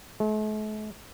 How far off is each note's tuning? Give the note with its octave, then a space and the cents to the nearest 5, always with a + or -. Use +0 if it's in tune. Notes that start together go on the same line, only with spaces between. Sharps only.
A3 -45